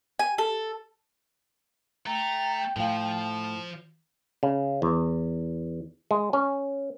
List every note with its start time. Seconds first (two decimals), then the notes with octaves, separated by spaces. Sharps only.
0.19 G#5
0.38 A4
2.06 A3 G5 A#5
2.76 A2 F3 F5 A5
4.43 C#3
4.82 E2
6.11 G#3
6.33 C#4